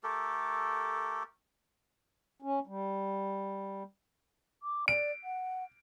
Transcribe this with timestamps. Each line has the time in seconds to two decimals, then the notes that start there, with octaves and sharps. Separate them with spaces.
0.03 A3 G4 A4 A#4
2.42 C#4
2.67 G3
4.63 D6
4.88 D5 D7
5.24 F#5